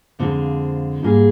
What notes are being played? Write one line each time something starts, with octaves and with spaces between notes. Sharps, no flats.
F2 D3 G#3 C4 F4
G#2 G3 A#3 F4 G#4